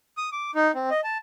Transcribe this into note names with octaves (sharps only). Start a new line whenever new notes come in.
D#6
D6
D#4
C4
D#5
A5